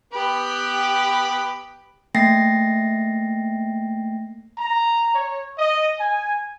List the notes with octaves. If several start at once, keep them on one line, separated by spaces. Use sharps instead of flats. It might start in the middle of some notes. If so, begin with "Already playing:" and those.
B3 G4 B4 G5 B5
A3 A#3 G5 A6 A#6 C7
A#5
C#5
D#5
G#5